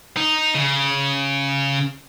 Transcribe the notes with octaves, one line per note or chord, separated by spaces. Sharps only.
D#4
C#3